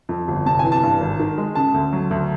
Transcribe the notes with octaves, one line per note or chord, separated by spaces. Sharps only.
F2
G1
C3 A5
E3 G#5
A5
G2
G#1
D#3
G#3
C#3 A5
D2
F#3
D2